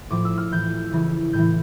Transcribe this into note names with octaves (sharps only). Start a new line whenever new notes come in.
A2 F3 D6
E6
F6
A2 E3 G6
C#3 E3
A2 E3 G6